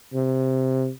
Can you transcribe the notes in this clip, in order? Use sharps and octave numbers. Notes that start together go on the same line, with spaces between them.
C3